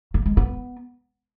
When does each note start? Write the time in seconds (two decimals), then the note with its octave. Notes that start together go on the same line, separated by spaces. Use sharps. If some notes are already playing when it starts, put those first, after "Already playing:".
0.14 A3
0.26 G#3
0.37 B3